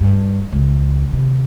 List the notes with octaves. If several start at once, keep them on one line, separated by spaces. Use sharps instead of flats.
G2
C#2
D#2 C3